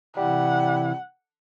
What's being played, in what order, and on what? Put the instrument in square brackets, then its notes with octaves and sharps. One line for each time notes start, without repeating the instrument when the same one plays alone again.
[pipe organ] C3 E3 E4 [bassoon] G3 [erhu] F#5